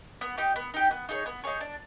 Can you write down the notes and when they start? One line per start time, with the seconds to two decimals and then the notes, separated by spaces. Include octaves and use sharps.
0.21 B3
0.38 D#4 G4
0.56 B3
0.74 D#4 G4
0.91 B3
1.09 D#4 G#4 C#5
1.26 B3
1.44 D#4 G#4 C#5
1.61 D4